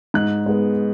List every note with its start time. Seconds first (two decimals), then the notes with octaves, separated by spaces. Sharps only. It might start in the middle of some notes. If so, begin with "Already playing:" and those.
0.14 G#2 F#6
0.46 G#3 B3